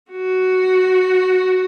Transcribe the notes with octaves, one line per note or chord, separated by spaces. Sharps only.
F#4